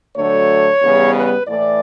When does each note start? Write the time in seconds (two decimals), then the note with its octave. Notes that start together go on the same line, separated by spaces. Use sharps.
0.16 D2 D3 F#3 A3 C#5
0.82 E2 C#3 G3 B3
1.15 B4
1.48 A2 E3 A3 D5